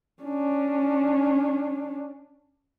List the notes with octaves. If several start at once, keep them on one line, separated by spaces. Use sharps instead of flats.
C#4 D4